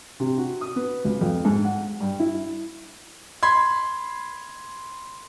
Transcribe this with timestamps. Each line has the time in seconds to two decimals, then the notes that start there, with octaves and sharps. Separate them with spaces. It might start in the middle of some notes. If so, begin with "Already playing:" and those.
0.20 C3
0.38 F#4
0.61 D#6
0.76 B3
1.05 C#2
1.21 F2
1.45 G#2
1.64 F#5
2.00 G2
2.20 E4
3.43 B5 C6 G#6